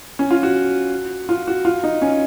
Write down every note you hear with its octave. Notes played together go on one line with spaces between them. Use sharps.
C#4
F4
F#4
F4
F#4
F4
D#4
C#4